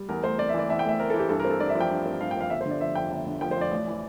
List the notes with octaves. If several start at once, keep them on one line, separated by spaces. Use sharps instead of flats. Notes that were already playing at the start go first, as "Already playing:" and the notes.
Already playing: G3
E2 A#4
A3 C5
C4 D5
E5
E3 D5
E2 E5
G5
A3 E5
C4 A#4
A4
E3
G4
G2 A4
A#4
C4
A4
G2 D5
E5
F3
G5
G2
C4
G2 F5
G5
F3 F5
G1 E5
C5
D3
D5
F3 E5
F2 G5
G1
D3
F3 G5
C5
F2 D5
A1
E3